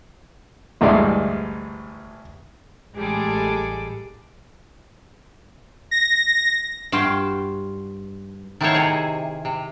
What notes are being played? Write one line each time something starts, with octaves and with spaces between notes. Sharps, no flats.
A1 D2 G2 G#3 D5
A1 G3 G#3 G#4 A4 D6
A#6
G2 F4 F#4 F5 G5
D#3 A3 B3 E4 C5 C#5
C3 G#4
C3